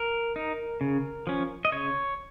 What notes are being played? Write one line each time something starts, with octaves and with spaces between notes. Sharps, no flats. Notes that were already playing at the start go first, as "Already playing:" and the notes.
Already playing: A#4
D#4
C#3
F3 C#4
D#5
C#3 C#5